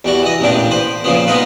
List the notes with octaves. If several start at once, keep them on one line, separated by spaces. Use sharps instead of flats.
E2 G3 F#4
E3 D#5
A1 E2 A#2 D4 G4
B4 C5
A#2 C#3 F3 B3
G#3 B3 D#4 F4 B4